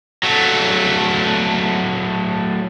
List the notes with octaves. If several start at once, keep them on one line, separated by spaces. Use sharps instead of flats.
F#3 A3